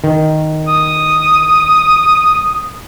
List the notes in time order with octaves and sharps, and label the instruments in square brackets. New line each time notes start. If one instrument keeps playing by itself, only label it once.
[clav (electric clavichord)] D#3
[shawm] D#6